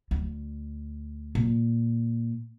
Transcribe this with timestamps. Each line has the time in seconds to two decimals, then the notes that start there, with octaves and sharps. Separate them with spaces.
0.11 D2
1.35 A#2